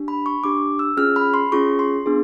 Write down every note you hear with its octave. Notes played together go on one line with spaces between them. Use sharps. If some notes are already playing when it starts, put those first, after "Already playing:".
Already playing: D4 G4
B5
C#6
D4 G4 D6
E6
C#4 F4 G#4 F6
B5
C6
C#4 F4 G#4 C#6
C6
B3 D4 F4 G#4